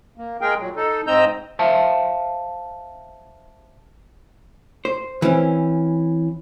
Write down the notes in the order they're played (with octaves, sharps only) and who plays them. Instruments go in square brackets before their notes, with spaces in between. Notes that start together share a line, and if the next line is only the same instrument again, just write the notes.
[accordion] A#3
G#3 G#4 A#4 G5
A#2 F#3
D#4 A4
G#2 C4 D#5 A#5 E6 G6
[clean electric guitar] C5 E5 F5 A5
[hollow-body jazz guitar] C5
E3 C4 C#4